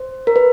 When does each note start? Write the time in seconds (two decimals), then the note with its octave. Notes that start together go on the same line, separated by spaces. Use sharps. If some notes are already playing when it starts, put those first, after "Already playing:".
Already playing: C5
0.27 A#4
0.36 B4